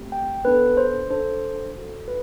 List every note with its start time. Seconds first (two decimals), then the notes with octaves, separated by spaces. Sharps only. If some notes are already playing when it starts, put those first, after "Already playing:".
Already playing: A3 C4 G4
0.12 G5
0.45 B3 D4 A4 B4
0.77 C5
1.10 D4 A4 C5
1.76 D4 F#4 A4
2.08 B4